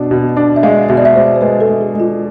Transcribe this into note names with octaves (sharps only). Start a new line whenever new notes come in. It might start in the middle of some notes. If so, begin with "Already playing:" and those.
Already playing: B2 D4
B2
D4
E5
G#3 F5
B2 E5
D5
E5
G#3 C5
C5
G#3 B4
A4
G#3
G#4
G#3
F4